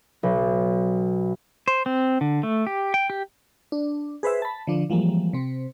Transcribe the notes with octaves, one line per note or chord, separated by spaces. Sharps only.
B1
C5
C4
D3
A3
G4
G5
G4
D4
G#4 B4 C5 E5
A5 B5
D3 F3 D4
E3 F3 G3 G#3 A#3
C3 C4